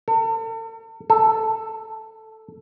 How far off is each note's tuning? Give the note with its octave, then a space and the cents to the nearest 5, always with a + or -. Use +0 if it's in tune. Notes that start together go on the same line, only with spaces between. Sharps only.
A4 +40
A4 +0